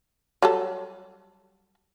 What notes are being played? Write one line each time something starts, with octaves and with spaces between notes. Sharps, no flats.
F#3 G3 A4